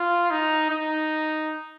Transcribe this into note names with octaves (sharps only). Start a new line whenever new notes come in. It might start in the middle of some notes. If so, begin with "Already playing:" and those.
Already playing: F4
D#4
D#4